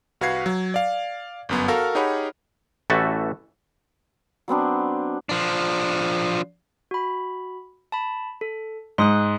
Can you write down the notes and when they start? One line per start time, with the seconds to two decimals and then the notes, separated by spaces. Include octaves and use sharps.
0.21 C2 F#4 B4 F5 G#6 C7
0.46 F#3
0.74 D5 F5
1.49 G1 F#2 B3
1.68 F#4 A4 A#4 F5 F6
1.95 D#4 G4 G#4 C#5 F#5 B5
2.90 A1 E3 A3 F#4 E5 A5
4.48 F#3 B3 C4 D4
5.29 F3 D4
6.91 F#4 B5
7.92 A5 B5
8.41 A4
8.98 G#2 C6 D#6 F#6